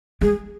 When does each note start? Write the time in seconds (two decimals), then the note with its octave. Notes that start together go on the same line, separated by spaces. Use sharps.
0.21 G#3 G#4